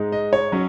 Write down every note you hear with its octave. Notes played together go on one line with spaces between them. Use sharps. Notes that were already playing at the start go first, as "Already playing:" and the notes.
Already playing: G#2 G#3 D#4
D#5
C#5
F#3 C#4